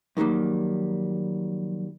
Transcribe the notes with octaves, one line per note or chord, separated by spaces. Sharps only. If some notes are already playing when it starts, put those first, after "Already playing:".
F2 D#3 F#3 G3 A#3